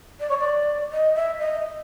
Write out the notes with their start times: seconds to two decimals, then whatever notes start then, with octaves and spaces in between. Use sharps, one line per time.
0.20 D5
0.29 C#5
0.38 D5
0.92 D#5
1.15 E5
1.39 D#5